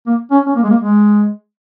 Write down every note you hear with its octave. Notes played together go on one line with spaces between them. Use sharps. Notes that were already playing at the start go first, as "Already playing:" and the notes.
A#3
C#4
C#4
A#3
G#3
A#3
G#3